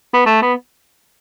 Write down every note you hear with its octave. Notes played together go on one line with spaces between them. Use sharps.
B3
A3
B3